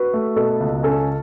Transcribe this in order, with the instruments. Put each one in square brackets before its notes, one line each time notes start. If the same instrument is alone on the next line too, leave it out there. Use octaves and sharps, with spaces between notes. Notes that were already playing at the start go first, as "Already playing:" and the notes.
Already playing: [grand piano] F#4 [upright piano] B4
[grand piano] A3
[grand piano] B2 [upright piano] A4
[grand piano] C#2
[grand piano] C#4 [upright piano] A4